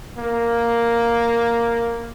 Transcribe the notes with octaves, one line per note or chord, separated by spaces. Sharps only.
A#3